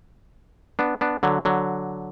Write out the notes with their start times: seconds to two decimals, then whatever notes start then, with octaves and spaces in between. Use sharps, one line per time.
0.79 B3 D4
1.01 B3 D4
1.23 D3 F#3
1.45 D3 F#3